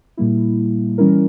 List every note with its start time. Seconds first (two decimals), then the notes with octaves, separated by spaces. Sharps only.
0.17 A#2 G3 A#3 E4
0.98 E3 G3 C#4 E4 A#4